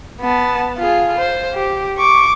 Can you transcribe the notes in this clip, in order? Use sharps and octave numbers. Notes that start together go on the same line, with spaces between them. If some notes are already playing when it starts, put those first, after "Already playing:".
B3 A5
F4 G#4
C5
G4
C#6 D6